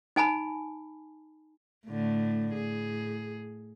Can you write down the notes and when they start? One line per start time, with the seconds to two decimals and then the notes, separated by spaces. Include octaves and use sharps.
0.16 D#4 G#5 A5 B5
1.87 A2 D3 A3
2.53 A2 G#4